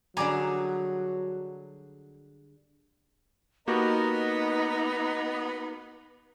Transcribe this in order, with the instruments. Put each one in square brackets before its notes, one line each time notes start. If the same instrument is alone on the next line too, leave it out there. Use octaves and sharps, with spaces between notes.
[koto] D3 G3 G#4 [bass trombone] F#3 [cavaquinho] A#5 D6
[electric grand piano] A#3 F#4 G4 [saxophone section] B3 [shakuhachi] D#4 [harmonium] D#5 A#5